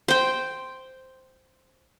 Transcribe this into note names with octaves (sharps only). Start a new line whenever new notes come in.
C5 G5